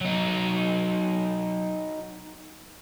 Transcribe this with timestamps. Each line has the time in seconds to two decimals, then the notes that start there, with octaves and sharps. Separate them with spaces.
0.01 F#3 D#4